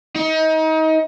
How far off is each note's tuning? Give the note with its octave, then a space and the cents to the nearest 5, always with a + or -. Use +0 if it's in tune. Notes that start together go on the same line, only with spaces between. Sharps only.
D#4 +30